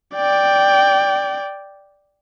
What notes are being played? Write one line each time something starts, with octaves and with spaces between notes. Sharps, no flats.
D5 G5